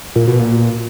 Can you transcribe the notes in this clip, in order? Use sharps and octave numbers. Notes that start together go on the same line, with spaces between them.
A#2
B2
A#2